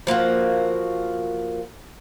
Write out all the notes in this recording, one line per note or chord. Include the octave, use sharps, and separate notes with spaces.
F3 A#3 F4 F#4